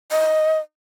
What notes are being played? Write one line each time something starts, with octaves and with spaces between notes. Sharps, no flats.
D#5